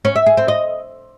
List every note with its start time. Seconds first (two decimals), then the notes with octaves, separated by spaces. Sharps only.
0.05 C#4
0.16 E5
0.26 G#4
0.37 C4
0.48 D#5